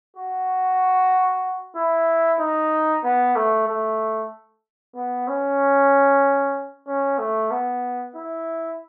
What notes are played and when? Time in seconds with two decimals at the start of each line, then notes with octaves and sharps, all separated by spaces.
0.17 F#4
1.76 E4
2.40 D#4
3.04 B3
3.36 A3
3.68 A3
4.96 B3
5.28 C#4
6.87 C#4
7.19 A3
7.51 B3
8.15 E4